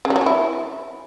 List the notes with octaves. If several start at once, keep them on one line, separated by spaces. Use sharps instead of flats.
C#3
G3
F#3
C#4
E4